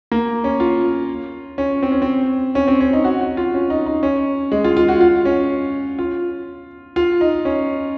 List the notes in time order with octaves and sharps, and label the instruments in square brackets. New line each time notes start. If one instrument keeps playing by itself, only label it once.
[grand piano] A#3
C#4
F4
C#4
C4
C#4
C4
C#4
C4
C#4
D#4
F#4
F#4
F4
C#4
D#4
D#4
C#4
G#3
F4
F4
F#4
F4
C#4
F4
F4
D#4
C#4